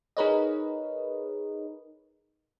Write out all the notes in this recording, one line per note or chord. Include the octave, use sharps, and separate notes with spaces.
D#4 G#4 A#4 B4 C#5 D#5